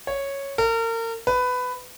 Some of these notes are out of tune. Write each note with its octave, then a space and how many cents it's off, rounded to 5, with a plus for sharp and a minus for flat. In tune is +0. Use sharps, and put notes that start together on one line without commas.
C#5 -5
A#4 -35
B4 +15